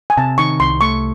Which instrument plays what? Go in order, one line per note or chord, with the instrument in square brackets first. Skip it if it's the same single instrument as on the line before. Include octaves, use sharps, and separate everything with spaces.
[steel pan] G#5
[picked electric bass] C3 [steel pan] A5
[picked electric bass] D#3 [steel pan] C#6
[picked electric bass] C2 [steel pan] C6
[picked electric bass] A3 [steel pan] C#6